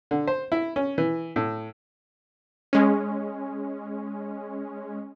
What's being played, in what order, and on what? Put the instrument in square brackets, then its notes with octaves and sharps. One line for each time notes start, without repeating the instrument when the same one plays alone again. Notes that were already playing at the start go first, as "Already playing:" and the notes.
[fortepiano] D3
C5
E4
C#4
E3
A2
[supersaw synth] G#3 C#4